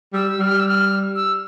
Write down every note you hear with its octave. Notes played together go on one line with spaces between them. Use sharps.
G3 E6
G3 F6
E6
F6
E6